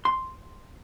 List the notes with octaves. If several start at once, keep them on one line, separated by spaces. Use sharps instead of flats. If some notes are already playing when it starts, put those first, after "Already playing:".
C6